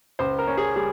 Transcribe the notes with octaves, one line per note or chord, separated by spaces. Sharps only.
C#2 C5
A#4
C#4
G#4
G3 G#4